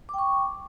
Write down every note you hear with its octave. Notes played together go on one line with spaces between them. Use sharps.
G5 C#6 D6